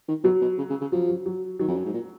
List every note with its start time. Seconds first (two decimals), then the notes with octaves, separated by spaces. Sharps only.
0.08 D#3
0.24 B2 F#3
0.41 B2
0.58 C#3
0.70 C#3
0.81 C#3
0.92 F3 F#3
1.09 F#3
1.26 F#3
1.59 D#3 F#3
1.68 F2
1.77 F#2
1.85 G#2
1.94 A#2